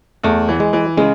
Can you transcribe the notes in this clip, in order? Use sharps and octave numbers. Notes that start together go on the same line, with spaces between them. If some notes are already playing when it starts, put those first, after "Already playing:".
E2 A3
E3
G#3
E3
C#3 G#3